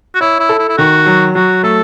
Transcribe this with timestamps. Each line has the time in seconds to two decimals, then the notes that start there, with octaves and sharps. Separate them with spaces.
0.15 F#4
0.21 E4 C#5
0.39 E4
0.49 A4
0.59 E4
0.69 E4
0.77 D#3 F#4
1.06 F#3
1.35 F#3 F#4
1.63 A3 A4